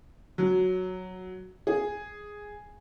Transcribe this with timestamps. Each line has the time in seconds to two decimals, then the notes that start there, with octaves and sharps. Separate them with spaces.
0.38 F#3
1.67 G#4